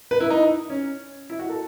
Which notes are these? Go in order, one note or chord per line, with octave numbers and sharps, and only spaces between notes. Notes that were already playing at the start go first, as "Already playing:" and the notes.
B4
E4
D#4
C#4
E4
F#4
A4